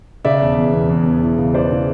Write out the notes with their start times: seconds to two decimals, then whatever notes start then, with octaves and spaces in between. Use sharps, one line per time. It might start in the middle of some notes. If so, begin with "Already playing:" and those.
0.25 C#3 D5 E5
0.41 E1
0.57 E2
0.73 E2
0.90 E2
1.06 E1
1.22 E3
1.39 C#3
1.54 E3 C5 D5
1.71 C#3